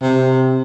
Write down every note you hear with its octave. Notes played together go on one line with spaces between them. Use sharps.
C3